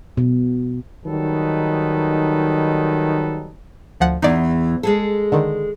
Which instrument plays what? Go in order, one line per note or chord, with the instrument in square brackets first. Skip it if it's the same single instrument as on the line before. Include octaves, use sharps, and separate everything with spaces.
[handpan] B2
[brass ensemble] D#3 F#3 G3 D#4 A4 B4
[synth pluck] D2 F3 F#5
[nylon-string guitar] E2 E3 [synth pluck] D#4 D5
[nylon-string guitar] G#3 G#4 A4
[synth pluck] D3 D#3